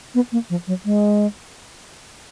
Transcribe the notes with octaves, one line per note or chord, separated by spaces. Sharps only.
B3
A#3
F3
F#3
G#3